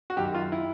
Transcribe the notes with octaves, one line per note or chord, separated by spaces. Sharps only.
F#4
F#2 D#3 F#3 G4
F4
E4